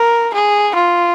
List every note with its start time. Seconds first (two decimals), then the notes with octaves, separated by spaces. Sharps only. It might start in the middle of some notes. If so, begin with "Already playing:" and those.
Already playing: A#4
0.34 G#4
0.75 F4